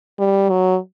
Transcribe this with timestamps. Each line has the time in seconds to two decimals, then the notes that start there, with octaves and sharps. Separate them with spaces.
0.19 G3
0.49 F#3